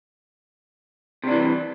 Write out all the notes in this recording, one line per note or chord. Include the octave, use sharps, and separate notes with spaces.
C3 E3 D4